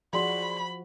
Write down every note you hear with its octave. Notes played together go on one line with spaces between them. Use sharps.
F3 F#4 G#4 D5 B5 C6